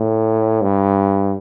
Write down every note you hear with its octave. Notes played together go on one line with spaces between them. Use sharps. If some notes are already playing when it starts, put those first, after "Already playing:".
Already playing: A2
G2